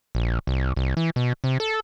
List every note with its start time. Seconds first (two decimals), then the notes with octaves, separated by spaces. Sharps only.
0.15 A#1
0.47 C2
0.76 C2
0.97 E3
1.16 B2
1.44 C3
1.60 A4